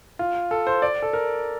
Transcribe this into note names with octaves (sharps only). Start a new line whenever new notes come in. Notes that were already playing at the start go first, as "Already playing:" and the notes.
F4
A4
C5
D5
A4
A#4